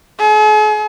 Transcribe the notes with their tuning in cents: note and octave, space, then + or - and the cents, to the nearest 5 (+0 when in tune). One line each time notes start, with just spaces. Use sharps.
G#4 +45